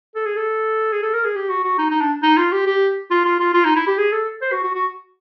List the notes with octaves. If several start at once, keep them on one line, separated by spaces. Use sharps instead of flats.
A4
G#4
A4
G#4
A4
A#4
G#4
G4
F#4
F#4
D#4
D#4
D4
D#4
F4
G4
G4
F4
F4
F4
F4
D#4
E4
G4
G#4
A4
C5
F#4
F#4
F#4